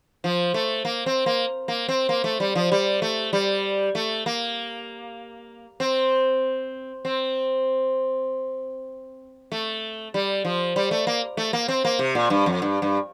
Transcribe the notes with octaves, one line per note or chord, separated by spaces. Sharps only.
F3
A3
A#3
C4
A#3
A#3
C4
A#3
A3
G3
F3
G3
A3
G3
A3
A#3
C4
C4
A3
G3
F3
G3
A3
A#3
A3
A#3
C4
A#3
C3
A#2
G2
F2
G2
G2